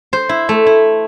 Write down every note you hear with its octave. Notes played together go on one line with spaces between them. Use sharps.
C5
E4
A3
E4